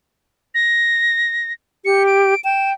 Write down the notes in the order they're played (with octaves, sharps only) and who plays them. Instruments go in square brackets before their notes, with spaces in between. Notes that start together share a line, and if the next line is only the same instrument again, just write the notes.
[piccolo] A#6
[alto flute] G4 [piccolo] C#7
[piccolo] D7
[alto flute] G5 [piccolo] E7